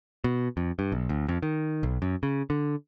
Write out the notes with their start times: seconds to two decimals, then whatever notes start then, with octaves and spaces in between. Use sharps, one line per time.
0.24 B2
0.57 F2
0.79 G2
0.92 B1
1.09 D2
1.28 F2
1.42 D#3
1.83 B1
2.02 F#2
2.23 C#3
2.50 D3